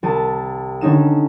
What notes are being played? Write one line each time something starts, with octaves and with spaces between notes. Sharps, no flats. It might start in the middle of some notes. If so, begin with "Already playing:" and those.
C2 A5 D#7
D3 C#4 D#4 E7